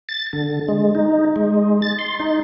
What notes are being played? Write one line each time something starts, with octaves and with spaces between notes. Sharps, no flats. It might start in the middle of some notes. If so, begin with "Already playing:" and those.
A6
D3
G#3
D#4
G#3
A6
C6
D#4